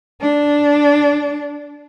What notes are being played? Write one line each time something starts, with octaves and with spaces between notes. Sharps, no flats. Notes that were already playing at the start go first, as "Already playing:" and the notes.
D4